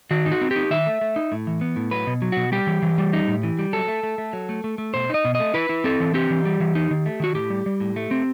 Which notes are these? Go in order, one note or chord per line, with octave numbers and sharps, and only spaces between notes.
D#3 F#4
D#4
F#4
C4
D#4 G4
D#3 E5
A3
A3
D#4
A2
E3
B3
A2
F#3 B4
B2
F#3
B2 F#4
G3 G4
E3
E3
G3
D#4
A2
E3
G3
F#3 A4
A3
A3
A3
F#3
A3
A3
A3
B2 C5
D#4 D#5
B2
D#5
A3
E4 B4
E4
C4 A4
E3
C4 G4
E3
G3
E3
D#4
D#3
A3
D#3 F#4
A2 G4
G3
G3
A2
A3
C4